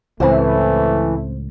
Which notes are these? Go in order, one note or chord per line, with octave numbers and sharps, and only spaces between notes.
C#2 A2 E3 A3 C4 C5